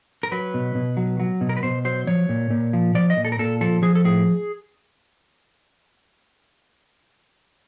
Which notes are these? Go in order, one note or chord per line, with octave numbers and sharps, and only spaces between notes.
A#4
F#3 B4
B2
B2
F#3
F#3
B2
A#4
B4
B2 C5
F#3 C5
F3 C#5
A#2
A#2
F3
F3 D5
D#5
A#2
A4
A#4
A#2 A4
F3 A4
F3 G#4
A4
A2 G#4